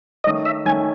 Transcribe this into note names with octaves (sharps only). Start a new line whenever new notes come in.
D#3 A3 C#4 D#5
E5
D#3 A3 C#4 G#5